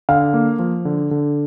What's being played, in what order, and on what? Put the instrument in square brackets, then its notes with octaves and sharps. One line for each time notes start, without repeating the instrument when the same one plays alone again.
[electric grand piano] D3 [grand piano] F5
[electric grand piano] A#3
F3
D3
D3